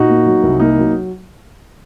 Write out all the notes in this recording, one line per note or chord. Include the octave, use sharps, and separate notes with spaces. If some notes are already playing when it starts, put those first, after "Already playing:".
Already playing: A#2 D#4 F#4
A#3
F#3
C2
A#3 D#4
F#3